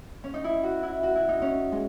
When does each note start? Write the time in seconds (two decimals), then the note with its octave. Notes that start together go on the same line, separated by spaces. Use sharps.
0.24 C#4
0.34 D#4
0.44 E4
0.63 F#4
0.83 E4
1.03 F#4
1.15 E4
1.29 D#4
1.42 C#4
1.72 G#3